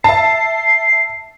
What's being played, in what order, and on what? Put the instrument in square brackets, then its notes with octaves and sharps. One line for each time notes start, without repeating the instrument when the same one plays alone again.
[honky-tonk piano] E5 A5 [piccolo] C7